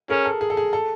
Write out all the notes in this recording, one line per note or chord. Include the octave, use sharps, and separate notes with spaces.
C#4 G#4 A#4
A4
G#4
A4
G#4
A4